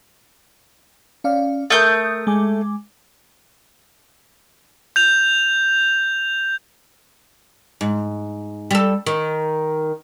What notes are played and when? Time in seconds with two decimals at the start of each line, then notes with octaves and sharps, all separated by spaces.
1.24 C#4 D5 F5
1.70 A3 A#4 D#6 G6
2.27 G#3 G#5 D6
4.96 G6 F7
7.81 G#2
8.71 G3 A4
9.07 D#3